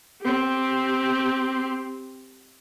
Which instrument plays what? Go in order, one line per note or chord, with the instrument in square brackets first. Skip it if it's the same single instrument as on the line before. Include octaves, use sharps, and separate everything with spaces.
[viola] C4 G4